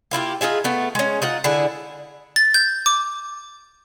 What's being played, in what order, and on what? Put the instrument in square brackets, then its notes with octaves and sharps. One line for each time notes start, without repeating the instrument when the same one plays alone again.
[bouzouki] A#3 E4 F4 G4
D#4 F4 G#4 E5
A3 B3
G#3 C#4
D#4 F4 F#5
D3 E4 G#4
[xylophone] A6
G6
D6